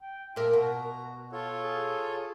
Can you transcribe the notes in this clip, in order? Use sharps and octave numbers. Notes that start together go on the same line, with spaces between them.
G5
A#2 F4 A#4 E5
B2 F#4 A#5
F4 A4 C#5
G#4